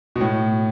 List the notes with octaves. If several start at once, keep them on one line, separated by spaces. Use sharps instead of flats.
B2
A2